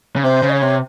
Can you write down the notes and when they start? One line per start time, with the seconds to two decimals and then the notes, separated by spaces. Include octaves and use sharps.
0.16 C#3
0.24 C3 C5
0.43 C#3
0.49 D#5
0.52 C#5
0.62 C3